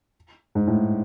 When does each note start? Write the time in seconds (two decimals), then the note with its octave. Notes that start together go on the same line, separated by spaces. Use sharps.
0.55 G#2
0.67 A2